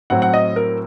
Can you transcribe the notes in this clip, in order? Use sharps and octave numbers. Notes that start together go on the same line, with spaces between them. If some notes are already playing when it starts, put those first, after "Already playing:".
A2 F#3 C4 F#5
F#5
D#5
A#4